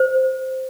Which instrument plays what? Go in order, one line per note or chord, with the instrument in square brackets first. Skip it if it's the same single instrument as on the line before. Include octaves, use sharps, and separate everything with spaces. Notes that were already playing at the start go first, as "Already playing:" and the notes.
Already playing: [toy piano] C5